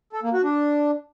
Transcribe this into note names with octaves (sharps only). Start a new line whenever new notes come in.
A4
A#3
F#4
D4